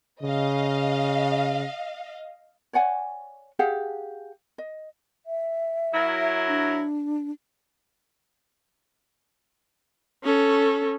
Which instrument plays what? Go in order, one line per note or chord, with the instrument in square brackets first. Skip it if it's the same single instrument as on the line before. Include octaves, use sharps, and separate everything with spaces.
[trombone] C#3 [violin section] D#5 F5
[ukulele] C#5 D5 F#5 G#5
G4 G#4 F5 F#5
D#5
[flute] E5
[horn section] F#3 E4 A#4
[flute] D4
[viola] C#4 A4